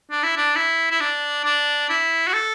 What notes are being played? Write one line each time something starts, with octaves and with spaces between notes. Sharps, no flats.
D4
E4
D4
E4
E4
D4
D4
E4
F#4
A4